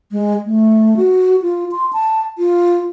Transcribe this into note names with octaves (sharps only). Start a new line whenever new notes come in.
G#3
A3
F#4
F4
C6
A5
F4